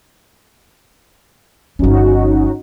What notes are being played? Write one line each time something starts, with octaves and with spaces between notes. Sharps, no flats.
G1 F3 C#4 D#4 F#4